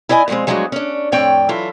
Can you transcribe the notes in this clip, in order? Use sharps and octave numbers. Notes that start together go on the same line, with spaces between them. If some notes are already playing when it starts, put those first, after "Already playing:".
E4 D5 D#5 F#5 G#5
B2 F3 F#3 G#3 C4
F3 F#3 G#3 A3 D4 F#4
C#4 D4
F2 A2 C4 C#5 D5 G5
E3 F#3 E4 F4 A4